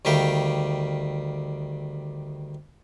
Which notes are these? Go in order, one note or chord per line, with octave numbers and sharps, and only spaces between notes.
D2 D#3 G3 E5 F5 G5